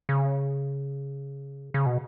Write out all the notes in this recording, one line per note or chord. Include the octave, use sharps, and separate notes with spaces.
C#3
C#3
B2